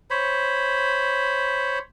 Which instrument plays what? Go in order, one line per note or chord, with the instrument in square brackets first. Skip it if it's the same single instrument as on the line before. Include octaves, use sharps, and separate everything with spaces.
[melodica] C5 C#5 B5